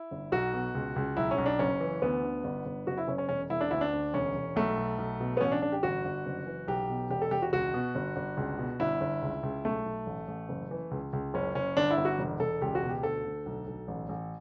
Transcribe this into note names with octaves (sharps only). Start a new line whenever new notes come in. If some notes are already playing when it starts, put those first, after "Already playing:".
Already playing: E4
G1
B1 F#4
B2
C#2
C#2
B1 E4
C#4
B1
D4
F#1 C#4
E3
D2 B3
D3
G1
G1
F#1 F#4
E4
F#1 C#4
C#4
E1 C#4
E1 E4
D4
D2 E4
D4
D2
E1 C#4
E1
B1 A3
B1
B1
B2
B3
A1 C#4
D4
A1 D4
G4
G1 F#4
G1
F#1
E3
B1 G4
B2
E1 G4
A4
E1 G4
F#4
C#2 F#4
B2
G1
G1
C#2
B2
G1 E4
G1
C#2
C#2
B1 A3
B1
A1
A1
F#1
E3
C#2
C#2
F#1 C#4
F#1 C#4
G1 D4
E4
G1
F#4
E1
E1 A4
C#2 G4
F#4
B2
G4
D2 A4
D2
B1
B1
A1
A1